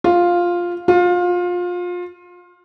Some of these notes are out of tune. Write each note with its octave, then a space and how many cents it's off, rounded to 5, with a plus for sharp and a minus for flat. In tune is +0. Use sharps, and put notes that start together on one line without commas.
F4 +5
F4 +25